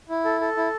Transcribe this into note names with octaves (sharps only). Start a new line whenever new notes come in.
E4
A4
A4
E4